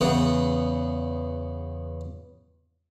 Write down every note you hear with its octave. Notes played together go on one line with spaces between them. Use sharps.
E2 C#3 B3